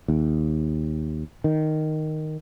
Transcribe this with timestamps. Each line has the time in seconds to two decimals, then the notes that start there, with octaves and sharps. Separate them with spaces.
0.08 D#2
1.44 D#3